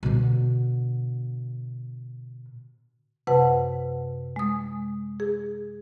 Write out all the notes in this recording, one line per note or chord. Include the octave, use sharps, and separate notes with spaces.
B2 D3
F#2 C3 B4 F#5 A5
G#3 D#6
G#4